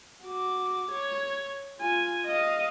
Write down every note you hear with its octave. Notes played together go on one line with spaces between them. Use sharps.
F#4 D6
C#5
F4 G#5
D#5 F5